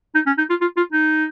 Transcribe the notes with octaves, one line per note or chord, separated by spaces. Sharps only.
D#4
C#4
D#4
F4
F4
F4
D#4